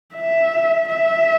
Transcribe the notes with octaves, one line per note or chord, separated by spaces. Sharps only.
E5
E5